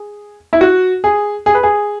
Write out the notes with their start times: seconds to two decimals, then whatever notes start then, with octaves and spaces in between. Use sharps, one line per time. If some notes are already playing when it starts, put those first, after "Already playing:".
Already playing: G#4
0.53 E4
0.61 F#4
1.04 G#4
1.46 G#4
1.54 B4
1.63 G#4